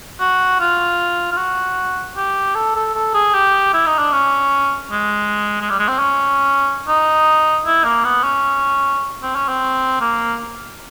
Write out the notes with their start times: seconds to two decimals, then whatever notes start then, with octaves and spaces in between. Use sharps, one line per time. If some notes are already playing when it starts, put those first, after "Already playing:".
0.20 F#4
0.60 F4
1.32 F4
1.37 F#4
2.17 G4
2.55 A4
2.76 A4
2.95 A4
3.14 G#4
3.34 G4
3.74 E4
3.87 D#4
3.99 D4
4.12 C#4
4.91 G#3
5.61 G#3
5.70 G3
5.79 G#3
5.88 C4
5.99 C#4
6.88 D#4
7.66 E4
7.84 A#3
8.04 B3
8.24 C#4
9.23 C4
9.36 C#4
9.48 C4
10.01 A#3